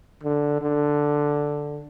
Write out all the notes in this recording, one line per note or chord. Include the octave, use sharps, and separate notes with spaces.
D3
D3